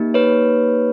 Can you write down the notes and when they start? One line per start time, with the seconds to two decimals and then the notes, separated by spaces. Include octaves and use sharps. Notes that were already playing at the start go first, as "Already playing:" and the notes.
Already playing: A#3 D#4 G4
0.14 B4 C#5